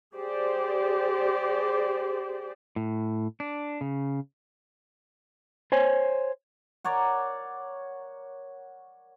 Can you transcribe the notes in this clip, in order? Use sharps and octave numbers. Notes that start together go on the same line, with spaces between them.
G4 G#4 C5 D5
A2
D4
C#3
C5 C#5 G#5
A#4 C#5 D5 F#5